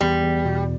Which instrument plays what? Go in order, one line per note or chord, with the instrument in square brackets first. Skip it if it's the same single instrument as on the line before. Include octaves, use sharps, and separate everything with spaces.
[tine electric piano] E2 [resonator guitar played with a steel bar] G3
[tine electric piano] E2
B2